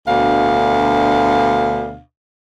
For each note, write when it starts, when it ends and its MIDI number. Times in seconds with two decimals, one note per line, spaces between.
0.08 2.00 38
0.08 2.00 47
0.08 2.00 62
0.08 2.00 77